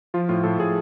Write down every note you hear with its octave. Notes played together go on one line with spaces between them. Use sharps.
F3 F4
A2 F4
A2 A4
A2 G#4